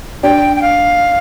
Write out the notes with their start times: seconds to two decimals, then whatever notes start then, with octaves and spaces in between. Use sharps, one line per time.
0.23 D4 G5
0.56 G5
0.62 F5